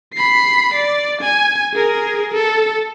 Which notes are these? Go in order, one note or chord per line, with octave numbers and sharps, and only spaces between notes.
B5 C7
D5
G#5
G#4 A#4
A4